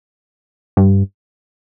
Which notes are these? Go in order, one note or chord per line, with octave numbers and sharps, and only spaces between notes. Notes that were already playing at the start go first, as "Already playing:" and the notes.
G2